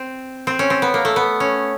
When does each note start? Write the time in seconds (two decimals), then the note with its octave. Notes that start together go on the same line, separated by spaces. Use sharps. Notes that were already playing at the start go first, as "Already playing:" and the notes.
Already playing: C4
0.47 C4
0.59 C#4
0.70 C4
0.82 B3
0.94 A#3
1.05 A3
1.16 B3
1.40 C#4